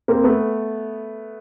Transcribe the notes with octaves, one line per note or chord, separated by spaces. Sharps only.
A#3 C4
A3 B3